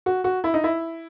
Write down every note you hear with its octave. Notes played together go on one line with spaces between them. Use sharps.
F#4
F#4
E4
D#4
E4